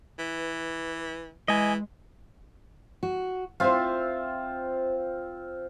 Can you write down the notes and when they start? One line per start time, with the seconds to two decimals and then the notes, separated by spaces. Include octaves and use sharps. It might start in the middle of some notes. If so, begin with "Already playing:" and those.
0.19 E3 B4
1.48 E3 G#3 D#5 G#5
3.03 F#4
3.60 C4 F4 C5 E5 F5